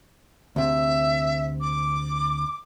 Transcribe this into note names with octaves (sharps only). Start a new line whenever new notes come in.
D2 C3 E5
D6